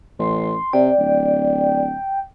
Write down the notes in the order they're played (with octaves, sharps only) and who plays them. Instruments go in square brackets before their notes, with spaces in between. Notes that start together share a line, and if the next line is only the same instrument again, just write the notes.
[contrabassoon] A1 [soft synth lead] C6
[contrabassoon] C3 [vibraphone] D5 [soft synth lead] G5
[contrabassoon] D1